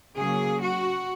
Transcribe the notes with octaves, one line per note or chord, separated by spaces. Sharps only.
C#3 F#3 A#3 G#4
F#4